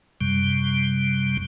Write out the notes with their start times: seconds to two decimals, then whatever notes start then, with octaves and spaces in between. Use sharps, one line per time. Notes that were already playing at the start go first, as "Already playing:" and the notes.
0.21 F#2 C3 G3